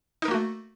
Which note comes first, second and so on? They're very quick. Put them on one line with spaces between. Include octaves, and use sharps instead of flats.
D#4 A#4 A#3 F#4 A3